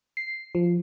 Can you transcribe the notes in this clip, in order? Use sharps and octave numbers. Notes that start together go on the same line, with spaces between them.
C7
F3